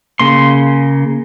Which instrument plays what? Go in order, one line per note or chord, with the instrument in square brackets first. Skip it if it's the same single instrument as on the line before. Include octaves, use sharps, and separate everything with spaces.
[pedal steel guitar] C#3 A#3 C6